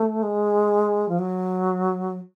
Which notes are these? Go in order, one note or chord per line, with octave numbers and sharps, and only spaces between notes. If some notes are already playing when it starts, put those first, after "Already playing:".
Already playing: A3
G#3
F3
F#3